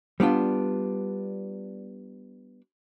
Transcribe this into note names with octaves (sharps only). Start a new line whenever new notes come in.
G3 B3 D4 F4